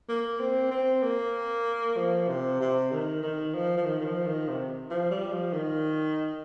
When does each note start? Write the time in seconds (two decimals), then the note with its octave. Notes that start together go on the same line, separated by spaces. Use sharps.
0.08 A#3
0.40 C4
0.71 C4
1.03 A#3
1.97 F3
2.29 C3
2.60 C3
2.92 D#3
3.23 D#3
3.54 F3
3.77 F3
3.86 D#3
4.01 D#3
4.06 F3
4.27 D#3
4.48 C3
4.90 F3
5.11 G3
5.32 F3
5.53 D#3